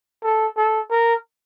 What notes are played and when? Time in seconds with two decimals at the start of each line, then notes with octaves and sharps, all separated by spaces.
0.24 A4
0.57 A4
0.91 A#4